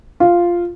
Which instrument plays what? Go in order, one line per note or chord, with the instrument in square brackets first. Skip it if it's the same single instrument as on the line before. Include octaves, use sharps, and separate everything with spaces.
[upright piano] F4